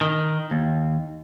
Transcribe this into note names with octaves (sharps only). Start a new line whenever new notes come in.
D#3
D#2